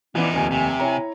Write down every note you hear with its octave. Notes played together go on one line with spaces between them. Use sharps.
E3 F3 B3 D4 D#4
F1 D#2 G#5
C3
E4 C#5 A#5